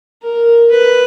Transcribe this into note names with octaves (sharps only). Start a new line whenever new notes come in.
A#4
B4